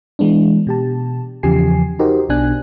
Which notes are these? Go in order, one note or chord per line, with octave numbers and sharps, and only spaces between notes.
E3 G#3 B3 D4
B2 G4 A5
E2 C#3 F3 G4 G#5 C7
D#4 F#4 G4 A#4 C5 D#5
B1 B2 D4 G#5 F#6